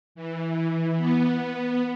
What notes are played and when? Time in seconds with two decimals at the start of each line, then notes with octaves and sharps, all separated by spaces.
0.15 E3
0.98 B3